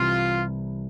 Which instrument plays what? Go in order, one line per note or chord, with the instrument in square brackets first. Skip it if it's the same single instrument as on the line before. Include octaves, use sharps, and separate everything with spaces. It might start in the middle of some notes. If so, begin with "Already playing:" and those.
Already playing: [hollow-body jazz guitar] C2 C3 E3 [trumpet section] F4